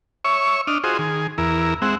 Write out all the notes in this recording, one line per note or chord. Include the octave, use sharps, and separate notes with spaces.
C#5 E5 C#6
D4 D#5 F6
F4 F#4 G#4 C5 D#5
D#3 G#4
E2 E4 A#4
G#3 C4 E5 F#5